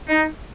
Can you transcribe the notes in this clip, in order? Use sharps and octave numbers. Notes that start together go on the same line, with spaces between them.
D#4